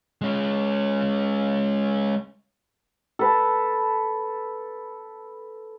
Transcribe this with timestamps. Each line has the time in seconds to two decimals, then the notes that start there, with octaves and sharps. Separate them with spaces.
0.22 G#3 C#4
3.19 A4 B4 A5